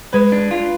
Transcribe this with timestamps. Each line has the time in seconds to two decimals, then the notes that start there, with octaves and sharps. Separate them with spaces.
0.13 G#3 B4
0.32 D4
0.51 F4